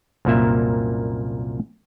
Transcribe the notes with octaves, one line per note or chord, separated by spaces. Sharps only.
C2 F#2 A#2 A#3 E5